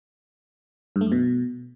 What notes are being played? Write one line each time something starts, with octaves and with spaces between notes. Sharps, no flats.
G2
A3
F#2
B2